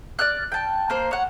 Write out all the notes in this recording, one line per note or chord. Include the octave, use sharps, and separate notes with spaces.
D5 F6 F#6
G5 A5
A#3 C5
C#5 F#5